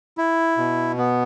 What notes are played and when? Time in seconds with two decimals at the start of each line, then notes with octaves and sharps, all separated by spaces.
0.18 E4
0.58 B2
0.97 B3